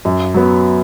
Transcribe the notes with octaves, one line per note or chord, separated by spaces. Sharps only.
F#2
F#3 B3